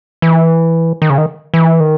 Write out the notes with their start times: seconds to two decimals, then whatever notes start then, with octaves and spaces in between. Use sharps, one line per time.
0.22 E3
1.02 D#3
1.10 C#3
1.18 D#3
1.54 E3
1.80 D#3